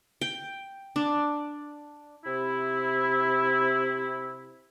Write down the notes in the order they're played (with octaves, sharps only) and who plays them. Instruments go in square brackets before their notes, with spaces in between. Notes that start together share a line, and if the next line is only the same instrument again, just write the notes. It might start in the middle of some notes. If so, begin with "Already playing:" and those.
[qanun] G5
D4
[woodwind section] C3 E4